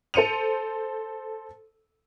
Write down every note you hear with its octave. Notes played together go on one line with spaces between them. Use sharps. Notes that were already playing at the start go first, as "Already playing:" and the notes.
A4 C5 C#7 D#7 F7